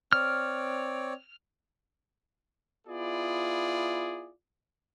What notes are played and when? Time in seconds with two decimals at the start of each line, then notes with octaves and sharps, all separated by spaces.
0.13 C4 C#5 D5 F6
2.87 B3 E4 F4 G#4 D5